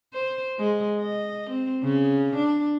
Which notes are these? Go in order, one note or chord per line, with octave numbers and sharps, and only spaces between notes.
C5
G#3
D#5
C4
C#3
D4